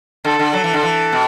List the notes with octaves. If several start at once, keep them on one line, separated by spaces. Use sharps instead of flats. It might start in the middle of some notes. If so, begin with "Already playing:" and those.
D3 A4
D3
F#3 A4
E3
D3
E3
B2